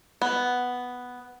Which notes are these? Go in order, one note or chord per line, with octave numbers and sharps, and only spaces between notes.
B3